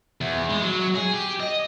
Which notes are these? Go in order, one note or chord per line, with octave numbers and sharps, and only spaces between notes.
E2
G#3
F#3
G#4
G4
D#5